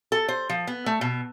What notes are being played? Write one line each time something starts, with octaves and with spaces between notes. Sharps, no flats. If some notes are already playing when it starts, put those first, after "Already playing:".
A4
C5
F3
B3
A3
B2